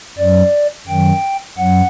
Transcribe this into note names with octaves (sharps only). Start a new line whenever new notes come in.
F#2 F#3 D5
F#2 D#3 F#3 G5
F#2 F#3 F#5